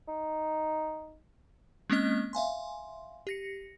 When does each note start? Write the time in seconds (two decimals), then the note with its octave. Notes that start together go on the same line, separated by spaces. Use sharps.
0.08 D#4
1.90 G#3 A#3 C4 C#4 D#5 F6
2.33 E5 F5 G#5 C6
3.27 G4 A#6 C#7